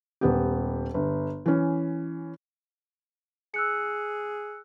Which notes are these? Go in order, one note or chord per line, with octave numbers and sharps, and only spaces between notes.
D#1 B3 G4
G1
E3 C#4
G#4 E6 F#6 C#7